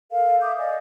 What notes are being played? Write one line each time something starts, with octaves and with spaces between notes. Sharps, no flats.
A4 A#4 F5
E5 D6 D#6 G6
D5 D#5 G#5